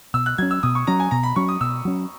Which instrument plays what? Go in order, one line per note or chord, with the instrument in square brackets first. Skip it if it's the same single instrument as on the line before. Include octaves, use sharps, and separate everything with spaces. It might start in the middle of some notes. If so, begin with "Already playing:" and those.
[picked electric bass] B2 [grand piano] E6
[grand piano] F#6
[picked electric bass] F#3 C#4 [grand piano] G#6
[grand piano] E6
[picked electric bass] B2 [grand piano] D#6
[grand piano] C#6
[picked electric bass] F#3 C#4 [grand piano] A#5
[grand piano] G#5
[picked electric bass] B2 [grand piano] A#5
[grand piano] B5
[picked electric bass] F#3 C#4 [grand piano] C#6
[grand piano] D#6
[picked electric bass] B2 [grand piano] E6
[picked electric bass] F#3 C#4